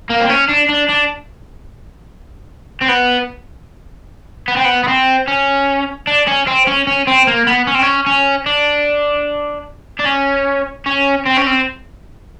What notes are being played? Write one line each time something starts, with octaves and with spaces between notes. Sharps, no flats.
A#3
C4
C#4
D4
D4
D4
C4
B3
B3
C4
B3
B3
C4
C#4
D4
C#4
C4
C#4
C#4
C4
A#3
B3
C#4
C4
C#4
C#4
D4
D4
C#4
C#4
C4
C#4
C4